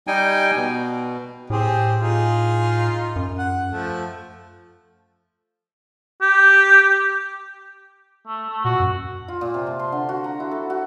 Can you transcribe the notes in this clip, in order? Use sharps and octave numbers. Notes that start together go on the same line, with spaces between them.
G3 D#4 G5 G#5
B2
A2 C4 G4 G#4
D#4 F4 G#4
F#2
F#5
F3 A3
G4
A3
A3
A#2 F#4
F#2
F4
A#2
C3
A5
C6
D3
F#4
A#5
E4
A4
F#4